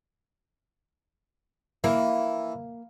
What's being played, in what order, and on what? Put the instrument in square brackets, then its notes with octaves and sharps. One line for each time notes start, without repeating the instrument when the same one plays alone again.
[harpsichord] E3 [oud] A#3